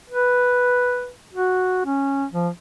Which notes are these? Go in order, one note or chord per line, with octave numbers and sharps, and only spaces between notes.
B4
F#4
C#4
F3